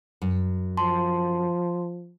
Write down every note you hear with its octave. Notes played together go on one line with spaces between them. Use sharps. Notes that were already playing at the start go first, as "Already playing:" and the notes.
F#2
F3 A5 C6